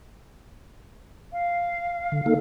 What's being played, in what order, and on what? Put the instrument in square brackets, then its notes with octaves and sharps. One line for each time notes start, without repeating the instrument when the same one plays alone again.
[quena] F5
[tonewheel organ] D3
A#3 D#4 A4